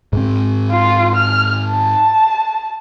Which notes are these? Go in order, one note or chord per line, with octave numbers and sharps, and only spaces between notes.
G#2 C4
F4
F6
A5